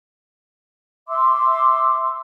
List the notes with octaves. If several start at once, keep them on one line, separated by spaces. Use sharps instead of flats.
E5 C6 D6 E6